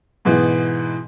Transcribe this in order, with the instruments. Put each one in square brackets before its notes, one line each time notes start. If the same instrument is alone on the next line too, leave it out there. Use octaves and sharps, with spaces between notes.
[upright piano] G#2 B2 E3 B3